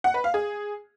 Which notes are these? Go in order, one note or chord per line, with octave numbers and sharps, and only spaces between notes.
F#5
B4
F5
G#4